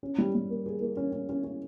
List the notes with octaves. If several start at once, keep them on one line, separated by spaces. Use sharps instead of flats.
C#4
G3
G3
A#3
G#4
A#3
C#4
C#4
C#4
C#4